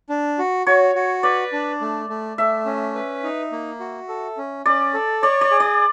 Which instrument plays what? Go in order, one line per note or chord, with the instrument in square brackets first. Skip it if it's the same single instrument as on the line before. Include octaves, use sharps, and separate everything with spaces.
[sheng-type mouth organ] D4
F#4
[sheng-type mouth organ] F#4 [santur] C#5
[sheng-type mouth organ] F#4
[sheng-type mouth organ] B4 [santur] D5
[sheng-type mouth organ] D4
A3
A3
[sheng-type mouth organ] A3 [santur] E5
[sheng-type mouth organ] C#4
B4
D#4
A#3
F#4
A4
C#4
[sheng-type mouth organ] C#4 [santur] D5
[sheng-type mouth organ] A4
[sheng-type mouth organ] C#5 [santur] D5
[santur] D5
[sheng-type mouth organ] G#4
[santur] D5